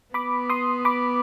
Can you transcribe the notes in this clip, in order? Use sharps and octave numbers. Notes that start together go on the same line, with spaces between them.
B3 B5 D6
C6 D#6
B5 D6